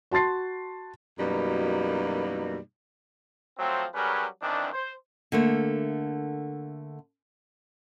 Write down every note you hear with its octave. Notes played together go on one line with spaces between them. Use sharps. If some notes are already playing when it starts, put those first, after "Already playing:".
F#4 A5 C6 A6 C7
F#2 B2 E3 G3 A#3 D#4
F3 F#3 A3 C4
F#3 G3 C#4 G#4 A#4 B4
F#2 D#3 E3 C4 D4
C5
D3 A3 A#3